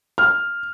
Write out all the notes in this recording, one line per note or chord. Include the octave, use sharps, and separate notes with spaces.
F6